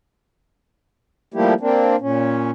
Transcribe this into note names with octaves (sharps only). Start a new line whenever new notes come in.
F3 G3 A3 A#3 E4 G4
A#3 C4 D4
A#2 C#4